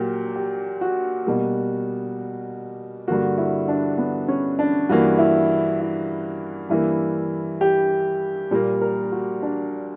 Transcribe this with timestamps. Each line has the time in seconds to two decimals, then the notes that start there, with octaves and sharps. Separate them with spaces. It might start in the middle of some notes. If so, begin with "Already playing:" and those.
Already playing: A#2 F#3 A#3 G4
0.36 G4
0.81 F#4
1.26 B2 G3 A#3
3.08 G2 D3 A#3 F#4
3.38 E4
3.68 D4
3.98 B3
4.28 C#4
4.59 D4
4.89 G2 E3 A#3 F#4
5.19 E4
5.80 E4
6.70 G2 E3 A#3 E4
7.61 G4
8.51 A#2 G3 A#3
8.82 A#4
9.12 F#4
9.42 D4